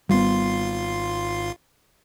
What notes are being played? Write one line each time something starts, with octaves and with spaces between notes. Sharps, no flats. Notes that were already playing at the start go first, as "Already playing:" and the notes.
G#1 G3 B3 F4 C6